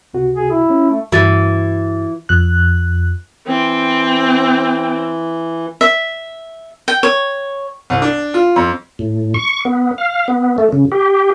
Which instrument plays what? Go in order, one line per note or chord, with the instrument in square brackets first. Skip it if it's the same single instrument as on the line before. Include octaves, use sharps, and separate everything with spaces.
[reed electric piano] C#2 C3 F#4
[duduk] G#4
E4
[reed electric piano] C#4
[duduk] A3
[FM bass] G2 [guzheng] E3 [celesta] F#4 A6
[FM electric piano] F2 F#6
[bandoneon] E3 [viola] C4 [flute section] G5
[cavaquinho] E5
G5
C#5
[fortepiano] C2
D4
F4
F2
[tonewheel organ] A2
C#6
B3
F5
B3
A3
C#3
G4